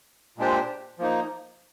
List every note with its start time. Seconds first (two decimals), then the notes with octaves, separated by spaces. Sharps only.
0.38 A#2 G#3 D4 G4 C5
0.99 F3 A#3 D#4